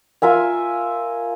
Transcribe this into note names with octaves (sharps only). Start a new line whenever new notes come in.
F4 A#4 E5 G#5